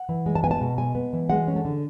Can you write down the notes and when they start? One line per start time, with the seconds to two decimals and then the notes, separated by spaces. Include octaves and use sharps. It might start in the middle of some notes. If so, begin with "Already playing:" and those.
Already playing: F#5
0.09 E3
0.26 G#3
0.35 A5
0.44 B3 G#5
0.51 A5
0.61 B2
0.78 G#3 G#5
0.95 B3
1.13 E3
1.30 G#3 F#5
1.47 C#4
1.56 A4
1.65 D3